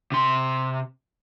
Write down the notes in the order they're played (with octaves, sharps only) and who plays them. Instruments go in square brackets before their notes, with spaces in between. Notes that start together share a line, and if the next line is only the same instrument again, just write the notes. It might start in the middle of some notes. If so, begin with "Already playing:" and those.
[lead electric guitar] C3 C6